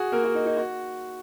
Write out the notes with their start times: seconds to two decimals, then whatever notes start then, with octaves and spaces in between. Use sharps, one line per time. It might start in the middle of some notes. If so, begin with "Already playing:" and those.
Already playing: F#4 G#4
0.12 A#3 A#4
0.24 F#4
0.35 D#4
0.46 D#4
0.57 F#4